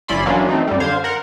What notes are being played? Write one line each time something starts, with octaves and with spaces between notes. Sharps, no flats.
G1 C#4 E4 D5 B5 C6
E3 F#3 A#3 C#4 D4 F4
A3 C4 D#4
F#2 G3
D3 C5 F5 G#6
A#4 F#5